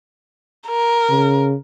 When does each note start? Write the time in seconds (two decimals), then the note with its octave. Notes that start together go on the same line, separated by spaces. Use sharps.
0.68 A#4
1.10 C#3